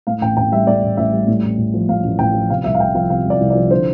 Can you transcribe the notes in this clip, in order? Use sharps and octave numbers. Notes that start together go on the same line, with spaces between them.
A2 F5
A1 G5
A1 G5
G3 E5
A2 D5
A1
A1 E5
G3
A2
A1
A1
F3
A2 F5
A1
A1 G5
F3
C3 F5
C2 E5
F5
C2 G5
F3 F5
C3 F5
C2 D5
C2
D5
F3
D3 C5